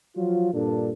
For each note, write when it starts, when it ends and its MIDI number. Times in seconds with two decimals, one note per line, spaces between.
0.16 0.49 53
0.16 0.49 54
0.16 0.49 65
0.54 0.93 43
0.54 0.93 46
0.54 0.93 62
0.54 0.93 69